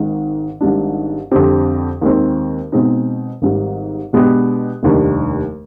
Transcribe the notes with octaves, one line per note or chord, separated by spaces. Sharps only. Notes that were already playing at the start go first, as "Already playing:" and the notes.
Already playing: G#1 G#2 D#3
G#1 G#2 G3 D4
F2 D3 G3 C4 G4
D#2 D#3 G#3 C4
B2 G#3 C4 D#4
G#1 G#2 G3
B2 G#3 B3 D4 G4
F1 D#2 D#3 G3 D4